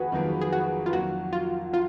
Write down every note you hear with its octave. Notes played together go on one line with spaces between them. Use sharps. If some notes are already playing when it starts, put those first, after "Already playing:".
Already playing: F2 D#3 A#3 F#4 G#4 B4
F2 D#3 F#3 A#3
G#4
F#4
F4
F2 D#3 F#3 A#3 F#4
F4
F4